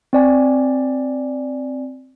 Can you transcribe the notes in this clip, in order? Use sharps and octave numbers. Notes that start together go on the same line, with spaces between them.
C4 D5 G#5